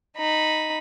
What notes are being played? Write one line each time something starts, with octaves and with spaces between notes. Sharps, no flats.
D#4 B5